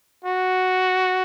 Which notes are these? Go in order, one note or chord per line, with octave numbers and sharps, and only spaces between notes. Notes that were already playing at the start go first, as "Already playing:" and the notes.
F#4